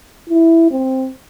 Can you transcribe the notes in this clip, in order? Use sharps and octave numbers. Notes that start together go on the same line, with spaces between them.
E4
C4